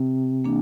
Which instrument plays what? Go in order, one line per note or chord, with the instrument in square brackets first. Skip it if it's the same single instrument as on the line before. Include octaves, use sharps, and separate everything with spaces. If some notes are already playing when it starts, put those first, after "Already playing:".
Already playing: [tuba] C3
[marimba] E3 A#3 D4